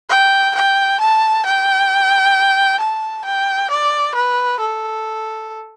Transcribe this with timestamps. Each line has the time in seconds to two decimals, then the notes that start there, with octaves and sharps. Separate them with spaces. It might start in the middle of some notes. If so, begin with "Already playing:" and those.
0.10 G5
0.55 G5
1.00 A5
1.45 G5
2.80 A5
3.25 G5
3.71 D5
4.15 B4
4.60 A4